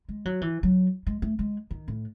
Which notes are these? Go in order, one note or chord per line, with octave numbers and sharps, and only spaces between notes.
G#3
F#3
E3
F#3
G#3
A3
G#3
D#3
A2